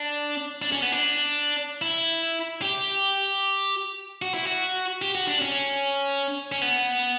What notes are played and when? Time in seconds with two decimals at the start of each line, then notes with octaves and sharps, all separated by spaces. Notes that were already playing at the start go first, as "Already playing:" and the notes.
Already playing: D4
0.62 D4
0.72 C#4
0.82 B3
0.92 D4
1.82 E4
2.62 G4
4.22 F#4
4.34 E4
4.45 F#4
5.02 G4
5.15 F#4
5.28 D4
5.42 C#4
6.52 C#4
6.62 B3